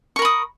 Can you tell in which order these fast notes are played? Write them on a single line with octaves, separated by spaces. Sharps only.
C#6 A#4 B5 D#6